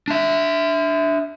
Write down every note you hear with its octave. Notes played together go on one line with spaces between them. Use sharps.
D4 E5